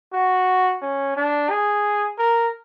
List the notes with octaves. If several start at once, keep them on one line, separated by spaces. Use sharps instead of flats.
F#4
C#4
D4
G#4
A#4